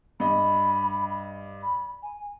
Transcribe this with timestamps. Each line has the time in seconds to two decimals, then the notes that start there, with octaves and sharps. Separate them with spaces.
0.20 G2 D#5 B5
1.63 B5
2.03 G#5